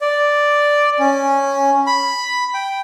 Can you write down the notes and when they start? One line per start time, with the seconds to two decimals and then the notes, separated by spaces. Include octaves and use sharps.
0.01 D5
0.99 C#4
1.87 B5
2.54 G5